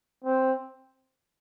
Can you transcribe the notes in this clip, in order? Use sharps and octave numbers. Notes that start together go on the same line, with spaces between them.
C4